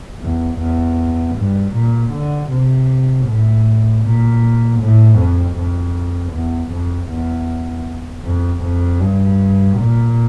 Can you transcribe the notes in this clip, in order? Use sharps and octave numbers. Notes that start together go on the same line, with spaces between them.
E2
E2
G2
A#2
D3
C3
A2
A#2
A2
F2
F2
E2
F2
E2
F2
F2
G2
A#2